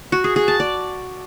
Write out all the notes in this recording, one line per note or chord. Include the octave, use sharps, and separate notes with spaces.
F#4
G#4
G#4
A5
D5